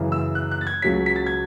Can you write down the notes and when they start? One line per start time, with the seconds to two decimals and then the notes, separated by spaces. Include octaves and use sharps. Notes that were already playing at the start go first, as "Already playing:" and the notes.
Already playing: F#2 C#3 E3
0.12 E6
0.35 F#6
0.51 F#6
0.61 A6
0.67 G#6
0.82 C#2 C#3 F#3 C#4 B6
1.06 B6
1.16 A6
1.26 G#6